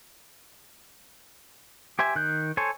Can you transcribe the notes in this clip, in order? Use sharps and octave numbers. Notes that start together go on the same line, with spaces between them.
G4 C5 E5 G#5
D#3 F#6 G6
A4 C5 C#5 G#5